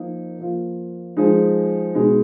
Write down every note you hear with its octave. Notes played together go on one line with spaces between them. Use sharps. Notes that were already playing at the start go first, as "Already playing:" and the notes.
Already playing: F3 A#3 D#4 A#4
F3 A#3 F4
F3 G#3 D#4
B2 G#3 D#4